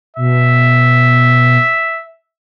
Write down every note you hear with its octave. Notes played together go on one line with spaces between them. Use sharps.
B2 E5